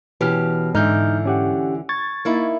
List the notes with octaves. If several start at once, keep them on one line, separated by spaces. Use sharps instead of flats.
B2 E3 C#4 G4 F6
G#2 D3 E3 D#4 F6 G6
C#4 G4 F#5
C#6 G#6 A6
A#3 D#4 E4